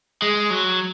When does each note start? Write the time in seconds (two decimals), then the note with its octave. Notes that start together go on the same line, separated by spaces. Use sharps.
0.22 G#3
0.50 F#3